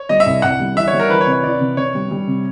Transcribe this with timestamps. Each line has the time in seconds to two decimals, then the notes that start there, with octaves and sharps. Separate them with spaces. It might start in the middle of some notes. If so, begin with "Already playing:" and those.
Already playing: C#5
0.09 G3 D#5
0.20 E5
0.26 C2
0.42 C2 F#5
0.60 G3
0.76 E3 E5
0.88 C#5
0.93 G3
0.99 A#4
1.09 E3 B4
1.21 C#5
1.27 C3
1.33 C#5
1.43 E3 D5
1.60 C3
1.77 C3 C#5
1.95 G3
2.11 G3
2.27 C3